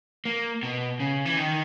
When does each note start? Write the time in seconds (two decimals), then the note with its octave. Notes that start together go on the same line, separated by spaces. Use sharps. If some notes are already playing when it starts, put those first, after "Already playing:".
0.25 A#3
0.63 B2
1.00 C#3
1.25 E3
1.37 D#3